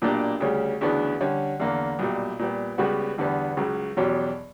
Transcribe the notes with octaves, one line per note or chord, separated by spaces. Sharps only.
B1 A#2 A#3 D4 G4
D2 C#3 G3 C#4
D2 C#3 E3 B3 D4
D3 G3 C#4
E2 D3 A#3
B1 A#2 G3
A#2 G3 B3
C#2 C#3 G3 B3 F#4
E2 D3 G3 B3
C#2 C#3 F#3
E2 B2 F#3 C#4 G4